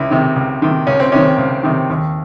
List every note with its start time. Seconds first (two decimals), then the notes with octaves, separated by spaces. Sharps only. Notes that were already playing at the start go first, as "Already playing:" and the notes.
Already playing: C#2 E4
0.11 C3 D#3
0.36 C#2
0.62 C3 D#3
0.87 C#2 C#4
1.00 C4
1.12 C3 D#3 C#4
1.38 C#2
1.63 C3 D#3
1.90 D#2